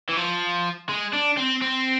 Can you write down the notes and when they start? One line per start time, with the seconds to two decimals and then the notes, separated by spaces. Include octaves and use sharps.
0.09 E3
0.17 F3
0.89 G#3
1.13 D4
1.37 C4
1.61 C4